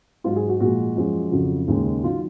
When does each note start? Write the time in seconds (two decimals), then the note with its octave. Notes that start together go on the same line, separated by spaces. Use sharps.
0.24 G#2 F#3 F4
0.36 G#4
0.49 F#4
0.60 A#2 F3 G#3 F#4
0.96 F#2 F3 G#3
1.32 F2 C#3 F#3
1.68 D#2 C#3 G#3
2.03 D#3 F#3 F4